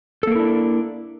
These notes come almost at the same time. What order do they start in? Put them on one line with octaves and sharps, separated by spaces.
A4 A#3 A#4 E4 D4